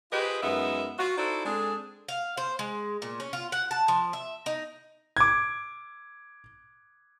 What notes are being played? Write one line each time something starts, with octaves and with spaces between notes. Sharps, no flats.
F4 G4 G#4 B4 C5 D#5
F#2 G#3 B3 D#4 A#4 E5
F4 F#4
D#4 E4 F#4 A4 C5 D5
G#3 C4 D4 G#4 A4
F5
C5
G#3
A#2
C#4
F4
F#5
A5
F3
E5
D#4
D6 G#6